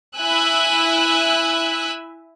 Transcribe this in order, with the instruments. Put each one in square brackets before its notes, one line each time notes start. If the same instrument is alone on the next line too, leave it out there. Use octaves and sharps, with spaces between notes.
[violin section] E4 E5 G#5 E6 F#6